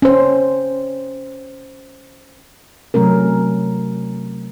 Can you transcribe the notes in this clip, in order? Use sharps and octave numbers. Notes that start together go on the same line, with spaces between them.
C#4 C5
C3 F#3 A3 C#4 A#4